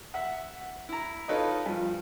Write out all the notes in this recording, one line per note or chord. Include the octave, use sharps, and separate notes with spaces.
E5 F#5
E4 A#5
D#4 F4 A4 B4 C#5 D#5
G2 F3